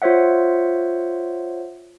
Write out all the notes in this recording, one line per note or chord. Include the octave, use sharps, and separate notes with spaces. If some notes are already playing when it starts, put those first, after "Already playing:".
F4 C5 C#5 E5 F#5